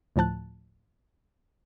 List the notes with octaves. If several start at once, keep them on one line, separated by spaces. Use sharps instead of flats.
D2 A2 F3 A5 F#6